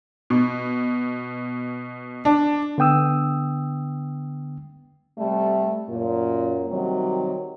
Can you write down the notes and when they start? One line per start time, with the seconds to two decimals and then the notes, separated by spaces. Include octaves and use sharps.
0.30 B2
2.25 D4
2.78 D3 B3 G5 D#6 E6
5.18 C3 G3 A3
5.89 F#2 A#2
6.69 C3 D#3 F#3 G3